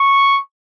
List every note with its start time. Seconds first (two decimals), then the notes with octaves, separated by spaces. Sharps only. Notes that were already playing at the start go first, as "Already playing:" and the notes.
Already playing: C#6